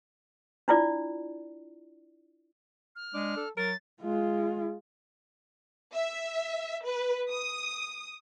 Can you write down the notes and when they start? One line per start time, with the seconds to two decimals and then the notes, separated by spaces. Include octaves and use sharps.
0.68 D4 E4 F4 D5
2.96 F6
3.14 G#3 D4
3.36 A4
3.57 F#3 A#4 A6
4.02 G#3 F4
5.94 E5
6.86 B4
7.31 D#6